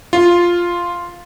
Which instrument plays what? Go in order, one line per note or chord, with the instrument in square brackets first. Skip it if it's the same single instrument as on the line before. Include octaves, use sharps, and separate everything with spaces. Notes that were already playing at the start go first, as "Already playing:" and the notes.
[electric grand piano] F4